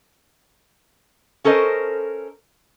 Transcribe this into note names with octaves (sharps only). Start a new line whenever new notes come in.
C#4 A4 A#4 C5 D#5